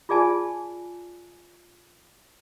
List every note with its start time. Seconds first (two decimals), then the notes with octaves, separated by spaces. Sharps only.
0.09 F4 G#4 D5 G#5 A5